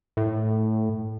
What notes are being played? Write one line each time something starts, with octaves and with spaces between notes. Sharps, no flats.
A2